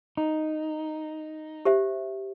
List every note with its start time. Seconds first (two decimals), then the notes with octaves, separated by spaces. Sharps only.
0.17 D#4
1.65 G4 C5 E5